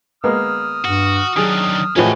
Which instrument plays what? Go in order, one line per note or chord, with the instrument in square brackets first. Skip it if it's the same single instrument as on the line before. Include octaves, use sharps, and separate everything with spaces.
[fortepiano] G#3 A#3 B3 [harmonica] D#6 F6
[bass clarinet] G2 [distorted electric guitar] F#4
[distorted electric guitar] D#3 D4 [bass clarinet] F#3 [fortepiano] G#4
[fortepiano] A2 E3 F3 [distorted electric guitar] C#4 D#5 [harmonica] F#4 G#4 C#5